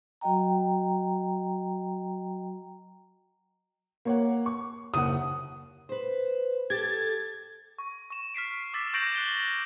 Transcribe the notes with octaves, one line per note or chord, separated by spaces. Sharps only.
F#3 F#4 D#5 G5 A#5
A#3 C#5 F#5
C#6
F#1 D#2 F#5 D#6
B4 C5
G4 A4 G#6 A6
C#6
C#6 E7
F6 B6 C7 D7
D6 E6 A6 B6
C#6 G6 A#6 C7 D7 F#7
F#6 G7